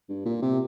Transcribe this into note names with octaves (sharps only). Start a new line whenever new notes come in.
G2
A#2
C3